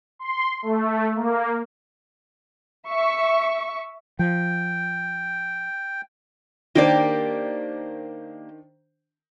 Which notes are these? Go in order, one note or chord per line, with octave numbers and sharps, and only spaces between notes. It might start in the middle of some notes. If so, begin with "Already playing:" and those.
C6
A3
A#3
E5 C#6
F3 G5
D#3 A#3 D4 G4 C5 D5